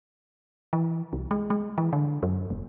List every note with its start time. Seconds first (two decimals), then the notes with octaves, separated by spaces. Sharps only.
0.73 E3
1.13 C2
1.31 G#3
1.50 G#3
1.78 E3
1.93 D3
2.23 F#2
2.50 E1